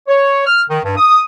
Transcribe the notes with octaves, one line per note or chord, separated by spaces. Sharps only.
C#5
F6
D#3
G2
D#6